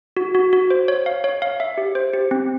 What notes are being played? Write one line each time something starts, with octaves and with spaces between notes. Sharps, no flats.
F#4
F#4
F#4
C5
C#5
F5
C#5
F5
E5
G4
C5
G4
C4